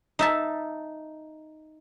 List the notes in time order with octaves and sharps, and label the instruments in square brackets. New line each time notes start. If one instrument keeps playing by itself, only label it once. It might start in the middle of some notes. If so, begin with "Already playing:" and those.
[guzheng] D#4 E5 A5